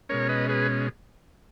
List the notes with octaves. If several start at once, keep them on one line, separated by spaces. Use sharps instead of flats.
B2 G#3 C#4 A#4 C#5
B4 D#5
G#4 B4